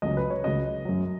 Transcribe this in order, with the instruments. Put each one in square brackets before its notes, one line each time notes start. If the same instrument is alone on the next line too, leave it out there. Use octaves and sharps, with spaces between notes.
[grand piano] C#2 C#3 F#3 D#5
B4
C#5
C#2 C#3 F#3 D#5
F#2 F#3